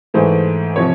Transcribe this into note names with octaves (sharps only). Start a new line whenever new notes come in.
G#2 E3 A3 C5
C3 F3 C#5